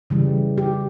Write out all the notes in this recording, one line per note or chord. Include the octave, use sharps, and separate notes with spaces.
C#3 E3 G3
G4